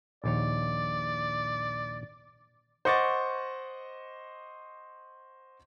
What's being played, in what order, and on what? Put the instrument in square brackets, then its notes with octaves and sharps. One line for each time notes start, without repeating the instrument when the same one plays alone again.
[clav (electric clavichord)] A#1 D#2 C#5 [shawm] D5
[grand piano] C5 D#5 F#5 C#6 D6 A6